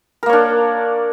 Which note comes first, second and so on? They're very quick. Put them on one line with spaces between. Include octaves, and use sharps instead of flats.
A#4 A#3 C#5 D4